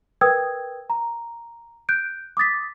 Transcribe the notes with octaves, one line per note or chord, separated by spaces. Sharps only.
A#4 B4 G5 D#6 E6 G#6
A#5
F#6 G6 D7
D6 D#6 A6 B6